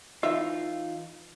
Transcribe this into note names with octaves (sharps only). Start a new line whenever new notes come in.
E3 D#4 F4 E5